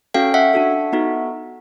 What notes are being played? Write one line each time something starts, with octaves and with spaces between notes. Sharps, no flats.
C#4 F#4 A4 F5 G5
E5 F#5
D4 F#4 A4
B3 D#4 F#4 A4